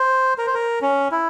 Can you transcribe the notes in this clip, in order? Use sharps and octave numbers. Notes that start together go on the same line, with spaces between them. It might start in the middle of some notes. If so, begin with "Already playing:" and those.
Already playing: C5
A#4
C5
A#4
C#4
E4